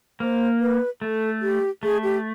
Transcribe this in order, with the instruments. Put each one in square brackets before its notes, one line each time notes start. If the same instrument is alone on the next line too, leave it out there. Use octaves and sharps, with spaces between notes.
[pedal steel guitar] A#3 [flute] C5
[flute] B4
[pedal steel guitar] A3 [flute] A4
[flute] G4
[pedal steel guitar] A3 [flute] G#4
[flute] G4